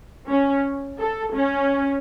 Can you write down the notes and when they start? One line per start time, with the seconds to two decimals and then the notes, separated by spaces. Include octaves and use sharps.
0.28 C#4
0.99 A4
1.34 C#4